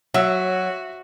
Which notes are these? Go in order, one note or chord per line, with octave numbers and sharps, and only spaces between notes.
F#3 F#4 E5 E6